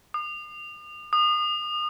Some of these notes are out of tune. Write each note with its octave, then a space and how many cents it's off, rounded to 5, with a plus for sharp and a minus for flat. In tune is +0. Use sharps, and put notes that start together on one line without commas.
D#6 -45
D#6 -30